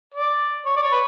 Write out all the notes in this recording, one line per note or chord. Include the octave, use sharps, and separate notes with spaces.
D5
C#5
D5
C#5
B4